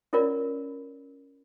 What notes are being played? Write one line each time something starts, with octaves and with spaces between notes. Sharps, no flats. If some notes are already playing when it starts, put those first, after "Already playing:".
C#4 E4 F4 A#4 C#5 D5